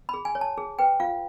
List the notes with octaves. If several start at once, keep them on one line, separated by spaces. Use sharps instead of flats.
G#4 B5
G#5
C#5
A5
G#4
B4 G5
F4 F5